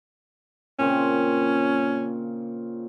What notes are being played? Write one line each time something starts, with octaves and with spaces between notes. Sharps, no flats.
A#2 C#3 C4 C#4